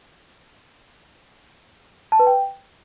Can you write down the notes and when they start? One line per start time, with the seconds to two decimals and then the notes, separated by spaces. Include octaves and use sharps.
2.12 A5
2.19 B4
2.27 G5